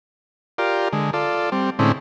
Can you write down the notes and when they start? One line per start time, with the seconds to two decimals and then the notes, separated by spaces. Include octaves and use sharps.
0.58 F4 G4 A#4 D5
0.93 D3 G#3
1.13 F4 A4 D5
1.52 G3 C4
1.79 A2 D3 G#3 C4 C#4 E4